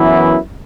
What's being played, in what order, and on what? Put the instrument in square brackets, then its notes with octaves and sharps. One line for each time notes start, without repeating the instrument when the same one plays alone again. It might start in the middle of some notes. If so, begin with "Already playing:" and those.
Already playing: [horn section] F#2 E3 B3 E4